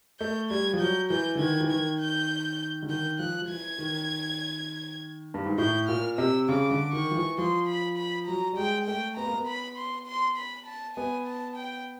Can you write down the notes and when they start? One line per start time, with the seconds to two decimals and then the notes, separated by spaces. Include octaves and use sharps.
0.20 A3 G6
0.50 G3 G#6
0.73 F3
0.80 F#3 G6
1.10 E3 G6
1.35 D3
1.39 D#3 G#6
1.60 E3
1.70 D#3 G#6
2.00 G6
2.82 D3
2.89 D#3 G6
3.19 F3 F#6
3.42 F3
3.50 E3 G#6
3.79 D#3
5.34 G2
5.46 G#2
5.58 A2 G6
5.88 A#2 F6
6.18 C3 E6
6.49 C#3 D6
6.71 D3
6.93 D#3 C#6
7.11 F3
7.15 E3
7.38 F3 C6
7.67 B5
7.98 B5
8.27 F#3 A#5
8.53 G3
8.57 G#3 G5
8.87 A3 G5
9.17 B3 A#5
9.26 A#3
9.33 B3
9.47 B5
9.78 C6
10.07 C6
10.37 B5
10.66 A5
10.96 B3 G#5
11.27 A5
11.56 G5